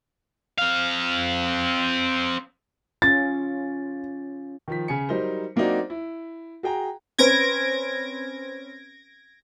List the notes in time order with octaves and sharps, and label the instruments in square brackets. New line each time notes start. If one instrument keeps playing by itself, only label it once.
[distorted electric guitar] C4 F5
[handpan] C#4 F4 [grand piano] A6
[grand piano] D#3 F3 B6
C#3 G#5 C#7
F#3 G3 D#4 A#4 C5
F#3 A#3 C4 D4 D#4 F#4
E4
F#4 G#4 G5 A#5
[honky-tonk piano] C4 C#4 B4 [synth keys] G#6 A#6 D7